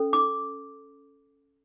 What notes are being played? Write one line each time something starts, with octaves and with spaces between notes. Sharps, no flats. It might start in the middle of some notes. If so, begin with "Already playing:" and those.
Already playing: C#4 A4
D6